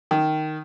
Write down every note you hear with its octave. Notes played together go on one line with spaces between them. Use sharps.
D#3